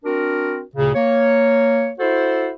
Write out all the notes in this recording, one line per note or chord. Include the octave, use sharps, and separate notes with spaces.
C4 D4 F#4 A#4
D2 A#2 C#3
A#3 C#5
E4 F#4 A4 C5